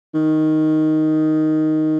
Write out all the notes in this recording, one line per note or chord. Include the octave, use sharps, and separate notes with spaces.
D#3